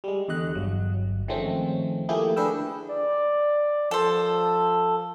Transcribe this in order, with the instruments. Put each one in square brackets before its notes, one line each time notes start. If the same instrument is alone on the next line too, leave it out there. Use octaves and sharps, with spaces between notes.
[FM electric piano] G3 G#3
E2 D3 D#5 F#6
G1 F#3
D#3 F3 G#3 A3 C4 C#4
F3 A3 A#3 E4 G4 G#4
D3 D4 G#4 B4 G5 E6
[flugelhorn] D5
[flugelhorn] F3 [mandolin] A4 C5